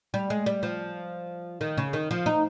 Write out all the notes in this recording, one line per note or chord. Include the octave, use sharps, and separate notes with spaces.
G3
G#3
G3
F3
D#3
C#3
D#3
F3
D#4